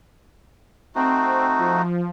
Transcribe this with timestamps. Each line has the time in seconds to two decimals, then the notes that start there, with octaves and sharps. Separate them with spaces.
0.95 A3 C4 D#4 F#4
1.58 F3